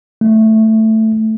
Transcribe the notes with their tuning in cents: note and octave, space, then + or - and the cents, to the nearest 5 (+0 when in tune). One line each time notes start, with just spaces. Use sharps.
A3 +5